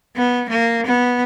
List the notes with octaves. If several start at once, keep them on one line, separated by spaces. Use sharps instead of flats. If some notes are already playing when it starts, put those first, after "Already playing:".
B3
A#3
B3